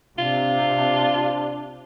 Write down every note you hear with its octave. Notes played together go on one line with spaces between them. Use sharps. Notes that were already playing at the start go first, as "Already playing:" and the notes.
C3 D4 F4